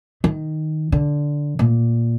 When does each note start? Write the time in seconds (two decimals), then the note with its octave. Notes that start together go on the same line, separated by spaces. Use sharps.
0.24 D#3
0.92 D3
1.59 A#2